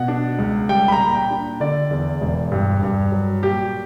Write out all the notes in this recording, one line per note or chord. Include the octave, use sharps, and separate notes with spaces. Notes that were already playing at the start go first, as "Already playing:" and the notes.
Already playing: B2 F#5
D4
C#2
G3 G5
B5
A#5
A#2
G5
D4
D3 D5
E2
E1
G2
G2
F#3
A#2 G4